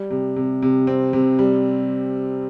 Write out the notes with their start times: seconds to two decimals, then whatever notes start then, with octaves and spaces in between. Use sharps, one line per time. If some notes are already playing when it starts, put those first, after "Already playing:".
Already playing: G3
0.10 C3
0.36 C3
0.62 C3
0.87 C4
1.13 C3
1.39 G3